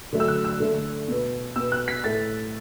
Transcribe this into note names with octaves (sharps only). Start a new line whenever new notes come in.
D3 F#3 A3
E6
F#6
E6
D3 A3
B2 B3
B2 B3 E6
F#6
B6
A2 A3 A6